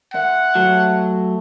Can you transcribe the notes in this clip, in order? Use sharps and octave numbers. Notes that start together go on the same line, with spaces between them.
C5 E5 F#5
F#3 A3 C#5